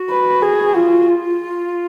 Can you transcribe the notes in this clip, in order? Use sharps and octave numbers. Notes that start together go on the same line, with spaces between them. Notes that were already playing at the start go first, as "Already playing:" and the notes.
Already playing: F#4
B4
G#4
F4
F4